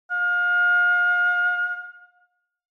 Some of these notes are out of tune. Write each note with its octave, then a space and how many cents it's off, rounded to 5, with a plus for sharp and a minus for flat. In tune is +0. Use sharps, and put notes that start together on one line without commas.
F5 +35